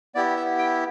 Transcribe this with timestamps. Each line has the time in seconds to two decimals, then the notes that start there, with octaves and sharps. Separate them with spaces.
0.15 B3 E4 G4 D5
0.37 E5
0.59 G5